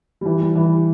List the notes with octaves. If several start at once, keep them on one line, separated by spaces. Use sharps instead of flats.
G3
E3
G3
E3